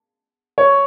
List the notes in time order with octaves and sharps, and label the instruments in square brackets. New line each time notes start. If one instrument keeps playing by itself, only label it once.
[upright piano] C#5